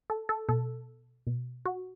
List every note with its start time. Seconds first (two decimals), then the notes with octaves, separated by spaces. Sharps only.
0.10 A4
0.29 A4
0.49 B2 A4
1.27 B2
1.65 F#4